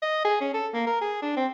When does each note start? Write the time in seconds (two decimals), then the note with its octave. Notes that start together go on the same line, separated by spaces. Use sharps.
0.02 D#5
0.25 G#4
0.41 C#4
0.54 A4
0.74 A#3
0.87 A#4
1.01 G#4
1.22 D4
1.37 C4